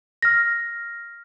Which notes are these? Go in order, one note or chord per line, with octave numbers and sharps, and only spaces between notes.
F6 A#6